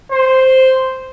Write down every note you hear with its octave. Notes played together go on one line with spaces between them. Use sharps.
C5